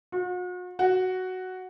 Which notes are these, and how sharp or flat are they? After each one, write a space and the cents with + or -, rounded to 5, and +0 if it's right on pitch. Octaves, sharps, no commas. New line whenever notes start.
F#4 -45
F#4 +5